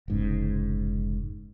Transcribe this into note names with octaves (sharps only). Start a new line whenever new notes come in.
F1 G#2 C#3